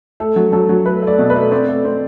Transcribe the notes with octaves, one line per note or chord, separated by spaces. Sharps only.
A3 A4
F#3
F#3 A4
F#3
A3 B4
A3 D5
B2
B4
A3
C4 D5
A3
C4